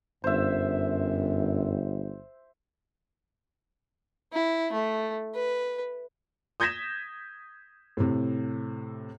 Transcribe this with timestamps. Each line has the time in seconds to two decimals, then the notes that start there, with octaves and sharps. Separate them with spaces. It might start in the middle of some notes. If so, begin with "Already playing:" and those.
0.24 G1 F#2 C5 E5
4.33 E4
4.72 A3
5.35 B4
6.60 D#6 G6 G#6 A#6 B6 E7
7.97 A2 C3